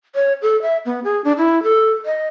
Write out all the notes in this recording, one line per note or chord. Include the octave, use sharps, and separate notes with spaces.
C#5
A4
E5
B3
G#4
D4
E4
A4
D#5